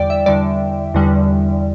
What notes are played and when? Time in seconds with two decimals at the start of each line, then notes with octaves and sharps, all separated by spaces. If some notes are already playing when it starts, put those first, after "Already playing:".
Already playing: E2 D3 G3 D5 G5
0.10 E5
0.26 E2 D3 G3 D5
0.94 E2 D3 G3